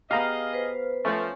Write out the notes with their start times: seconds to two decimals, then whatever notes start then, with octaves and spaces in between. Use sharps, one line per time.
0.11 B3 G4 G#4 D#5 F5 A#5
0.53 B4 C5
1.05 F3 A3 C#4 F#5